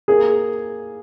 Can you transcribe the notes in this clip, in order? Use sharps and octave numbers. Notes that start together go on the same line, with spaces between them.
A#3 G#4